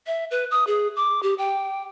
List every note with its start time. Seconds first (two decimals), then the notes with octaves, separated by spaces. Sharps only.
0.07 E5
0.31 B4
0.51 D#6
0.67 G#4
0.96 D6
1.23 G4
1.38 G5